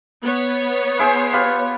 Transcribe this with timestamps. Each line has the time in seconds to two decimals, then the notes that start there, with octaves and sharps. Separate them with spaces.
0.24 B3 C#5
0.99 E4 G#4 C5
1.33 F4 G4 B4